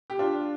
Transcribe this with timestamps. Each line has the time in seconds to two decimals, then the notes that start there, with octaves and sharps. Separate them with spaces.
0.10 G4
0.19 D4 F4